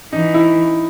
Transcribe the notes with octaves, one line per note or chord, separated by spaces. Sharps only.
E3 D#4
E4